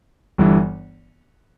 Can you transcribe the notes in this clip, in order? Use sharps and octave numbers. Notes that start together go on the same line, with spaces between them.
G1 G2 E3